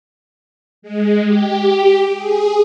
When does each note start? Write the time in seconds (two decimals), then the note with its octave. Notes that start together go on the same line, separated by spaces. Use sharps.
0.82 G#3
1.26 G4
2.15 G#4